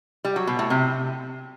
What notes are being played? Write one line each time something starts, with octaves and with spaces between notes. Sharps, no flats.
G3
F#3
B2
A2
C3